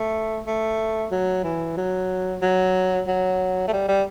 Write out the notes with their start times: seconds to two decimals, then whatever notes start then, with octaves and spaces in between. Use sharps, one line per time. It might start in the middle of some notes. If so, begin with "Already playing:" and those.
Already playing: A3
0.46 A3
1.11 F#3
1.44 E3
1.77 F#3
2.42 F#3
3.07 F#3
3.68 A3
3.73 G3
3.88 G3